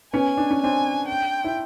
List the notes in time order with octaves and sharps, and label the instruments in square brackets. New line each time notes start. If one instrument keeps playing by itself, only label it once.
[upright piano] B3 C#4 [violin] G#5
[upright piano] D4
C#4
[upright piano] C4 D4 [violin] G#5
[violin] G5
[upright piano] E4